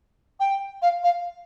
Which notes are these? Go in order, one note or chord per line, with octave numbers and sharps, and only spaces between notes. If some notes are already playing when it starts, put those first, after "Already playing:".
G5
F5
F5